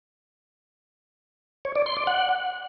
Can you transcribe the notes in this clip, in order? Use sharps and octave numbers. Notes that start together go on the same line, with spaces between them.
C#5
D5
C6
D5
F#5